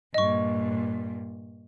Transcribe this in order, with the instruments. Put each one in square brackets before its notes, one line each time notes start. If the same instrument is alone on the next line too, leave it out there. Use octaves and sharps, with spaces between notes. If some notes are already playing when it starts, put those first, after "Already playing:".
[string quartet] G2 A#2 [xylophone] D#5 C#6